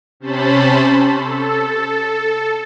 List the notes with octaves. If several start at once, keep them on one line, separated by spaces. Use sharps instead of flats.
C3 C#4 C5 A5 B5
A4